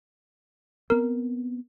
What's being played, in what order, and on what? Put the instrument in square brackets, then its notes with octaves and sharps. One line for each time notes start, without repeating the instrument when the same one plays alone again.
[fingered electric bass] B3 C4 [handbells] A#4